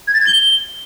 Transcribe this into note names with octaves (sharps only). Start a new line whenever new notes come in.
G#6
A6
G#6
G7